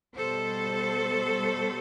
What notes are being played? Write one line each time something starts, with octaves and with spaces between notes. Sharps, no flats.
B2 G3 A4 C5